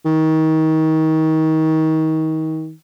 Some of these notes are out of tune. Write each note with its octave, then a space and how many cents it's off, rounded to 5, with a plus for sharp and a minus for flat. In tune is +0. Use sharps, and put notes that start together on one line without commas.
D#3 +30